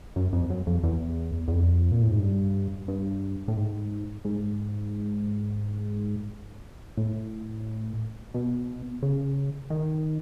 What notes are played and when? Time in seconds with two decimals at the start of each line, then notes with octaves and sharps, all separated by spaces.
0.16 F#2
0.33 F2
0.50 F#2
0.67 F2
0.83 E2
1.48 E2
1.52 F2
1.92 A#2
2.02 A2
2.10 G#2
2.20 G2
2.88 G2
3.48 A2
3.56 G#2
4.25 G#2
6.97 A2
8.34 B2
9.02 C#3
9.70 D#3